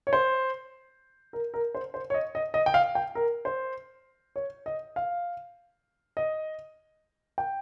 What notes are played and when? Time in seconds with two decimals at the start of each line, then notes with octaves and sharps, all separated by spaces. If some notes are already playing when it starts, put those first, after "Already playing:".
0.07 C#5
0.13 C5
1.33 A#4
1.54 A#4
1.75 C5
1.94 C5
2.10 C#5
2.14 D#5
2.35 D#5
2.54 D#5
2.66 G5
2.74 F5
2.95 G5
3.15 A#4
3.45 C5
4.36 C#5
4.66 D#5
4.96 F5
6.17 D#5
7.38 G5